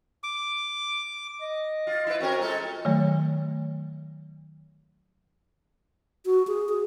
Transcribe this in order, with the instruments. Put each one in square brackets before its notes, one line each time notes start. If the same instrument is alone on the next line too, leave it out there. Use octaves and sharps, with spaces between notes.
[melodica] D6
[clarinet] D#5
[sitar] F4
E4 B4
[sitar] C4 C#4 A#4 [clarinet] F#4
[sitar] G#3 A4 A#4 [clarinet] F4
[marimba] D#3 F#3 A3
[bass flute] F#4
G#4
G#4